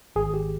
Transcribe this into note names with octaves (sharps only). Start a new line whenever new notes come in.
G#1 G#4
G4